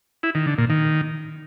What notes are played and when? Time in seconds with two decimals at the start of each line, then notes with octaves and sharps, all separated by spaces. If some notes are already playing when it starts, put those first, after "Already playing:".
0.23 E4
0.35 D#3
0.47 D3
0.58 A#2
0.70 D#3